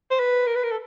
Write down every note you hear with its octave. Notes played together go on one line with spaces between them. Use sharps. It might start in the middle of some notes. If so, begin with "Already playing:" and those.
C5
B4
A#4
B4
A#4
A4